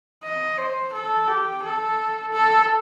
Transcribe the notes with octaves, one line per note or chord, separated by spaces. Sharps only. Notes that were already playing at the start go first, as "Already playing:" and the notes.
D#5
C5
A4
G4
A4
A4